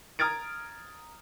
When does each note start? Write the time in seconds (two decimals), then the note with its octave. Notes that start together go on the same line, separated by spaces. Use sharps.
0.19 A#5 D#6 F6 G#6 A6 D7